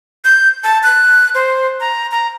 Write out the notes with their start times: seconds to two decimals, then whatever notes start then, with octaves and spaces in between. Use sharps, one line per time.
0.25 G6
0.64 A5
0.83 F#6
1.35 C5
1.80 A#5
2.11 A#5